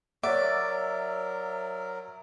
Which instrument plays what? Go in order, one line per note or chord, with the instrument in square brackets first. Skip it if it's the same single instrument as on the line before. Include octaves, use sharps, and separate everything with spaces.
[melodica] F#3 A#4 [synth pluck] C#5 F#5 [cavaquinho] D5 [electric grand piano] E5